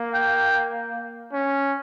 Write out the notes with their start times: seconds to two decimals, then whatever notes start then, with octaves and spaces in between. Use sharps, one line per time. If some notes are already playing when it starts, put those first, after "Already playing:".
Already playing: A#3
0.14 G5
1.33 C#4